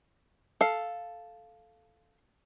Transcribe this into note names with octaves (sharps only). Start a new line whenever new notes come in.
A4 F5